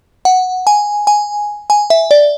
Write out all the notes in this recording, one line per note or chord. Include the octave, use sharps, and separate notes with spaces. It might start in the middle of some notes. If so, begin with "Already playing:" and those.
F#5
G#5
G#5
G#5
E5
D5